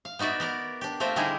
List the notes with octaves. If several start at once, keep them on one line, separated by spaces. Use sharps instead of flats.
F5
B3 D#4 F#4 D5 E5
B3 A#4 D5
D4 G4
A3 C4 F4 A#4 C5 E5
D3 G3 D#4 E4 G#4 A#4